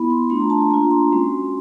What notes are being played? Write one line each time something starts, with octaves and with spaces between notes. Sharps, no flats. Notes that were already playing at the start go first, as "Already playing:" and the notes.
Already playing: B3 E4 B5
C6
A3 D4 F4 C6
A#5
A5
A5
A#3 D4 F4 A#5
C6
G#3 C#4 F#4